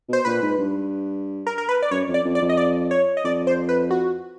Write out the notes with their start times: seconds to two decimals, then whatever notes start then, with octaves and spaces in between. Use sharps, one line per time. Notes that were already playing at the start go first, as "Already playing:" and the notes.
0.09 B2 C5
0.25 A#2 B4
0.42 G#2
0.59 G2
1.47 A#4
1.58 A#4
1.69 B4
1.82 D5
1.91 F#2 C#5
2.08 F2
2.14 D5
2.25 F2
2.35 D5
2.42 F2
2.49 D#5
2.57 D5
2.91 C#5
3.17 D#5
3.24 F2 D5
3.47 C5
3.69 B4
3.91 F#4